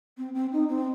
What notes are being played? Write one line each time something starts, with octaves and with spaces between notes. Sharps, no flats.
C4
C4
D#4
C4